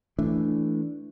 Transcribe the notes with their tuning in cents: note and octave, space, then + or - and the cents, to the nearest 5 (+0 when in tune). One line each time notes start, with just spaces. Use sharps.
E3 +0 A3 +0 D4 -15